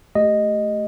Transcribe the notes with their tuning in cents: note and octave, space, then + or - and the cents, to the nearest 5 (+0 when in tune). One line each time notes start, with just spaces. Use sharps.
A3 -5 G4 +0 D#5 -5